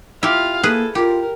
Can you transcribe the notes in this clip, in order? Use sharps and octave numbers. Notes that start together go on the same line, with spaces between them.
E4 F4 G4 F5
A#3 G#4 A4 B4
F4 G4 A#4